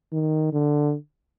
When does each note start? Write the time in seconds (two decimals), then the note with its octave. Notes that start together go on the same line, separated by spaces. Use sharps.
0.12 D#3
0.52 D3